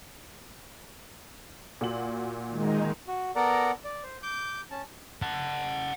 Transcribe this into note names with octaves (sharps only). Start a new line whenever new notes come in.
A#2 F#4 F#7
D#3 G#3 D#4
F#4
B3 A4 A#4 D5 F#5 A#5
D5
C5
D6 G6
C#4 A5
F#5 A5